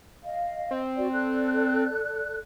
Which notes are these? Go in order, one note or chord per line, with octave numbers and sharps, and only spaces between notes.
D#5 F5
C4
F#4 D5
A4 D5 F#6